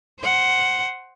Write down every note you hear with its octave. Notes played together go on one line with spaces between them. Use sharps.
C5 F#5